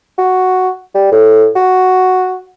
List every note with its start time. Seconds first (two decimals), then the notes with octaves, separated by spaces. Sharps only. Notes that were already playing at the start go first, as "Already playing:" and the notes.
0.19 F#4
0.95 G3
1.12 A2
1.56 F#4